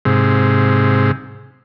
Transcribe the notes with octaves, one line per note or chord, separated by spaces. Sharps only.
G#2 C3